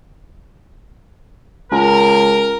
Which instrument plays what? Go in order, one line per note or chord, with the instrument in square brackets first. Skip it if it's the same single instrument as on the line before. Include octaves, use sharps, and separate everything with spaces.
[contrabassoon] C#2 [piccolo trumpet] A#4